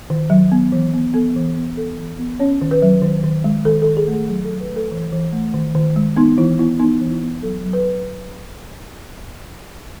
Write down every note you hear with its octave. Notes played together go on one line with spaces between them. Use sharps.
D#3
F#3
B3
E3
B3
B3 A4
E3
B3
B3 A4
E3
B3
C#4 C#5
D#3
B4
F#3
D#3
D#3
G#3
D#3 A4
A4
D#3
G#4
A3
G#4
F#3 G#4
F#3 A4
B4
A3
A4
E3
E3
A3
D#3
D#3
G#3
B3 D#4
E3 E4
B3 E4
B3 D#4
E3
E4
B3
F#3 A4
F#3
B4